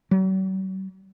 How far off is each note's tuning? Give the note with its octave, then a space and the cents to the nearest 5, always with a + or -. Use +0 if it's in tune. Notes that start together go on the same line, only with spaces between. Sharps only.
F#3 +45